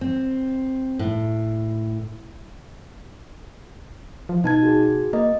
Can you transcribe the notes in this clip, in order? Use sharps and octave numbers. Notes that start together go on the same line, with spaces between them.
C4
A2
F3
B2 D#4 A5 G#6
F#4 G#4
A#3 D#5